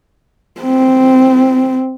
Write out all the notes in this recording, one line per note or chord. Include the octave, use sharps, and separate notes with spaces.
C4